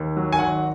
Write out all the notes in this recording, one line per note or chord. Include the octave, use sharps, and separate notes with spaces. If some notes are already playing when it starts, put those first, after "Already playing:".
Already playing: D#2
F#3
G#5
G#1 F#5